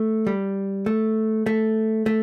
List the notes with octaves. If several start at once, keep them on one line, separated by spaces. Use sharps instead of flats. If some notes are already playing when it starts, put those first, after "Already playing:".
Already playing: A3
G3
A3
A3
A3